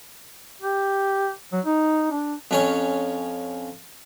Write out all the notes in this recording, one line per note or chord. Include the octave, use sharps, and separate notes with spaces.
G4
F#3
D#4
D4
F2 C#4 C#5